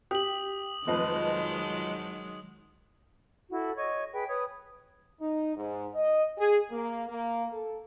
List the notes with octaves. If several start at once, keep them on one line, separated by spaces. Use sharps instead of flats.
G4 D#6 F#7
F1 D#3 F3 F#3 G#3 B4 D#5
E4 F#4 A4
C#5 D#5 C#6
G#4 B4 G5 B5
B4 C#5 D#6
D#4
G#2
D#5
G#4
A#3
A#3
A4